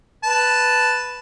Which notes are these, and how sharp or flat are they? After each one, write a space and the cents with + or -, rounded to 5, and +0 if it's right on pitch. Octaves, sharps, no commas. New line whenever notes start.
B4 +0 A5 +0